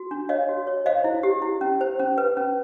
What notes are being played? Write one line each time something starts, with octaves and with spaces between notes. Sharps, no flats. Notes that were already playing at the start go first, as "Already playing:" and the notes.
Already playing: F#4
D4
C#5 D#5 F5
F#4
C#5
C5 D#5 F5
E4
G4
E4
C#4
C5
C#4
B4
C#4